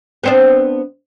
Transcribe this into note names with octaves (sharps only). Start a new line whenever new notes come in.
B3 C4 D4